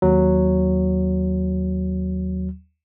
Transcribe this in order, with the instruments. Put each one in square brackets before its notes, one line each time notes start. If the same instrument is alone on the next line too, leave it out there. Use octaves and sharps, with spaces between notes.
[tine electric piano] D#2 F#3